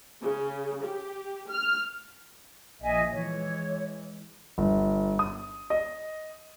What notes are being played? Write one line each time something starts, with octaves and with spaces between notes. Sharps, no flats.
C#3
G4
F6
A#1 F3 D#5 E5 G#5
E3 G#3 C#5
G1
D#6
D#5